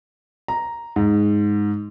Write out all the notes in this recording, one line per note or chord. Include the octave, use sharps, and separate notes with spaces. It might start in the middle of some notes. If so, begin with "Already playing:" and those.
A#5
G#2